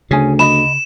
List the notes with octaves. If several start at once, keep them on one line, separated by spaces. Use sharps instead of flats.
D2 C#3 C#4 G#4 G#5
D#5 B5 E7